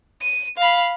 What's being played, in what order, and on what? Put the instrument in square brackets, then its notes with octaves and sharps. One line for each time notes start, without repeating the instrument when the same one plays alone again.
[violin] D#7
F5 B5